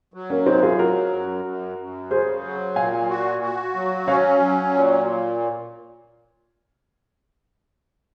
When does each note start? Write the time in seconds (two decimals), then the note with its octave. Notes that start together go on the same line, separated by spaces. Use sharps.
0.14 F#3
0.30 A#3 C#4
0.46 F#2 C4 D#4
0.63 F4 G#4
0.79 F#3 F#4 A#4
1.12 F#2
1.44 F#2
1.78 F#2
2.10 C#3 G#4 C5
2.44 F#3
2.76 A#2 F5 G#5
3.09 F#4
3.42 F#4
3.75 F#3
4.07 C#4 C#5 F5
4.40 F#3
4.73 A#2